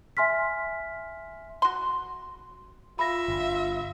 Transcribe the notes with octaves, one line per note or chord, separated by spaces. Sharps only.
E5 G#5 C6 F6 B6
F#4 C6
F4 E5 B5 A#6
G1